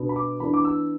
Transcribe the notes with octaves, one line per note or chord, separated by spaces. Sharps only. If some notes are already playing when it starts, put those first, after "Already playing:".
Already playing: B2 B3 D4
B5
D6
E3 B3 D4 B5
D6
E6